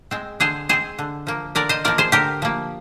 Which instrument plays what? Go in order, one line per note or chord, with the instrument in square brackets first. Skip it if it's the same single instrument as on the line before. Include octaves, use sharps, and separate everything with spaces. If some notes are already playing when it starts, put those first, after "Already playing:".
[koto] G#3 C4
D3 G#4 C5
G#3 C4 G#4 C5
D3
F3 A#3
D3 A#4 D5
C5 D#5
F3 A#3 A#4 D5
G#4 C5
D3 G4 A#4
F3 A#3